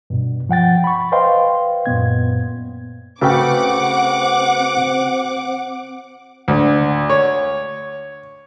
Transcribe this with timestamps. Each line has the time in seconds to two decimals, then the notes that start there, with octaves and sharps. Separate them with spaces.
0.10 G2 B2
0.49 F3 F#5 G5 A6
0.84 B5 C#6
1.12 B4 C5 D#5 F5 G5 C6
1.86 F#2 A#2 B3 G#6
3.21 C#3 A3 C4 F#4 B4 F#5 G5 D6
6.48 D2
7.10 C#5